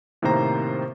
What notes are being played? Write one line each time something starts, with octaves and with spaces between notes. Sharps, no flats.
A2 C3 D#3 A#3 C5 A#5